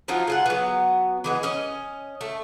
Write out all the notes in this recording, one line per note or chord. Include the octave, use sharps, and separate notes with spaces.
F3 F#3 D#4 F4
G#3 F4 F#5
F#3 B3
E3 G#3 B3
C#4 D#5
A3